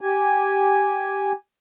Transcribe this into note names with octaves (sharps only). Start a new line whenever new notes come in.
G4 G#5